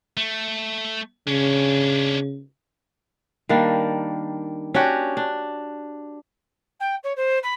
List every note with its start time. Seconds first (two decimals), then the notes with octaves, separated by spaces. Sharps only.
0.17 A3
1.27 C#3 C#4 D4
3.49 D#3 G3 A#3 D4
4.74 C#4 D4 F#4 G4
5.17 D4
6.80 G5
7.03 C#5
7.16 C5
7.43 B5